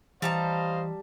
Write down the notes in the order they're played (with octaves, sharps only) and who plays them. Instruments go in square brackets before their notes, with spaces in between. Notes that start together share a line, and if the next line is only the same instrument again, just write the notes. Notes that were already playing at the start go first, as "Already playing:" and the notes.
[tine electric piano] E3 [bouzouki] G3 A5 A#5 [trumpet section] C5 D#5 F5